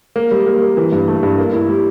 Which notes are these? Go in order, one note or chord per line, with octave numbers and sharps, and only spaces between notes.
A#3
G3
A#3
A#3
E3
G2
A3
G2
A#3
E4
G3